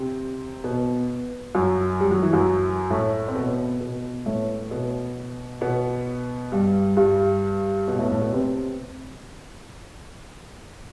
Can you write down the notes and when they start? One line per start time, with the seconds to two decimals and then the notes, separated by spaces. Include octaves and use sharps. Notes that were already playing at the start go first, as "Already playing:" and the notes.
Already playing: C3 C4
0.64 B2 B3
1.55 F#2 F#3
2.00 G3
2.11 F#3
2.22 E3
2.33 F#2 F#3
2.90 A2 A3
3.28 C4
3.35 B2 B3
3.81 B2 B3
4.26 A2 A3
4.71 B2 B3
5.61 B2 B3
6.52 G2 G3
6.97 G2 G3
7.87 B2 B3
7.99 A2 A3
8.10 A2 A3
8.21 B2 B3
8.33 C3 C4